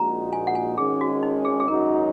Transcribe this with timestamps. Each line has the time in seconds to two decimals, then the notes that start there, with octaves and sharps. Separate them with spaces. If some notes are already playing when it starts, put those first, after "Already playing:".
Already playing: A#1 A#2 G#3 D#4 F#4 A#5
0.33 G#5
0.47 F#5
0.55 G#5
0.78 G#1 G#2 D#3 G#3 C#4 G#4
1.01 F#4
1.23 D#4
1.45 G#4
1.60 G#4
1.68 G#1 F#2 F#3 D#4 A#4